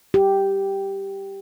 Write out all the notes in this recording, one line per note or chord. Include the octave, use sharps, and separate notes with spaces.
G4